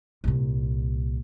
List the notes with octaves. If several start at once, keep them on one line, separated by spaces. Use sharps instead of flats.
C2 A#2